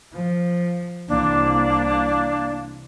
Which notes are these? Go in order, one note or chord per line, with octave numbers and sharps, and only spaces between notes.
F3
C2 C3 E3 A#3 C4 D4